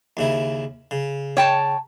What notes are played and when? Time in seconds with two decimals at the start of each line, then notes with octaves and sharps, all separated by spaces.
0.17 D#2 C#3 E4
0.91 C#3
1.37 C#5 G5 A5